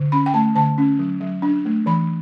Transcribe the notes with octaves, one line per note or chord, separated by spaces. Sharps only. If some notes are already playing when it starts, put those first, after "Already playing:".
Already playing: D3
C#4 B5
G5
A3 A5
D3 A5
C#4
F#3
F#3
D4
A3
E3 B5